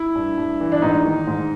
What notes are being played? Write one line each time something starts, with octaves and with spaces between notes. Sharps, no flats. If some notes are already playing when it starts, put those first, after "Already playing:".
Already playing: E4
G2
G2
E3
D4
G#2 D#4
D#3
G#2